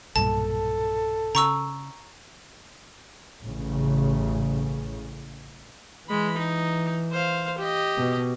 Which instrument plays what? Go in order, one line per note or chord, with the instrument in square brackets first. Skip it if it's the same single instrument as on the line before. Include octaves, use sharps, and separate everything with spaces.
[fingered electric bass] B1 G2 A#2 [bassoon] A4 [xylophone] A5
[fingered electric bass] C#3 [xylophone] A#5 C#6 E6
[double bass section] A1 C#3
[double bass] E3 [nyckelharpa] G#3 B5
[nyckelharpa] D#4
C5 F5
G4 D#5
[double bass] B2